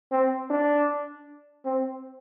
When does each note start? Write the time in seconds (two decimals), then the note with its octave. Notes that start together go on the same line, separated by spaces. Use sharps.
0.12 C4
0.50 D4
1.65 C4